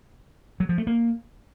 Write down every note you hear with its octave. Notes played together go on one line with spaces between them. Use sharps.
F#3
F3
A3
A#3